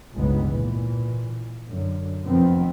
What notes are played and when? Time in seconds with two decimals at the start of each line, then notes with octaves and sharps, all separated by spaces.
0.14 G1 C#2 G#2 G#3 B3
0.47 A#2 E3
1.69 F#2 D3
2.25 F1 D#3 F3 B3 C4